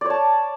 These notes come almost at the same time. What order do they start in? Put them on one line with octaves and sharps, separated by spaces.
D5 C#5 A5